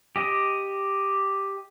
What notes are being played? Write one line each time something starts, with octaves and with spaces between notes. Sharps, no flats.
G4 D#5